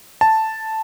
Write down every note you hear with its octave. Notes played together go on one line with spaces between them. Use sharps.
A5